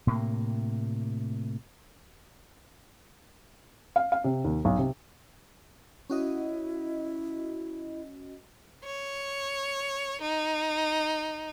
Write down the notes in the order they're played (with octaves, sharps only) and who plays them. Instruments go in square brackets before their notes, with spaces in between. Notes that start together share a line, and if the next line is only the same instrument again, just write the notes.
[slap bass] A2 C3 A#3
[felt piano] F5
F5
C3
D#2
B1
C3
[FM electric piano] C#4 F#4 D#5 [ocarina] E4
[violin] C#5
D#4